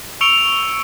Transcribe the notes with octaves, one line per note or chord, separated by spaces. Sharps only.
C#6 E6 C#7 D7 F7 G7